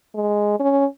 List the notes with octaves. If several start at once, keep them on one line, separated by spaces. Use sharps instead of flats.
G#3
C#4